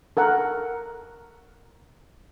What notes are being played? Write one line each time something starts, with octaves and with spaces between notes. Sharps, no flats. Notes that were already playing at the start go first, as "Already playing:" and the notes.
A4 A#4 F#5